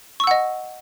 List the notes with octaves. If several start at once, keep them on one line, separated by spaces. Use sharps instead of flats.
D#5 F#5 C#6 E6